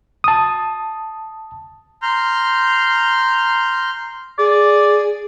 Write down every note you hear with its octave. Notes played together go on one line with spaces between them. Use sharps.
A5 D#6
A#5 C6 F6 G6
G#4 D5